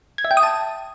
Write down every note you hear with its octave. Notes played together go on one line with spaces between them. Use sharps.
G#6
E5
G5
D#6
A5